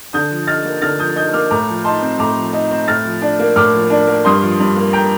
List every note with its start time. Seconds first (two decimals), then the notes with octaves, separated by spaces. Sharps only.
0.13 D3 D#6 G6
0.31 F3
0.47 D#4 F6 A6
0.64 A#3
0.82 D3 F6 A6
0.99 F3 D#6 G6
1.16 D#4 D#6 G6
1.34 A#3 D6 F6
1.50 A2 A#5 D6
1.68 F3
1.84 D#4 A5 C6
2.02 C4
2.19 A2 A#5 D6
2.36 F3
2.53 D#4
2.71 C4
2.88 A2 F6 A6
3.05 F3
3.22 D4
3.39 A#3
3.56 A2 D6 F6
3.73 F3
3.90 D4
4.07 A#3
4.25 G2 C6 D#6
4.42 F3
4.60 G2
4.76 A#3
4.93 G5 A#5